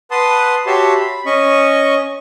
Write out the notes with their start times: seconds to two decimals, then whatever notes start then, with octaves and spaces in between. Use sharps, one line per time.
0.11 B4 F#5 A5 C6 D#6
0.67 F#4 G4 C#5 E5 A5 C6
0.95 B5
1.26 C#4 D#5 C#6